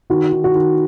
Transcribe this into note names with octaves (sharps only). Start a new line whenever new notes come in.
D#3 F#4
D#3
F#4
D#3